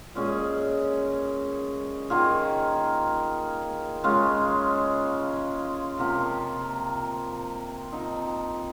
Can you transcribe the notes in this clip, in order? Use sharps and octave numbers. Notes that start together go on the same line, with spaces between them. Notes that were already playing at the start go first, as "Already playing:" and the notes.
A#2 G#3 C#4 G#4
D#3 A#3 F4 G#4
C#3 G#3 C#4 F4
C3 F3 A#3
F3 C4 D#4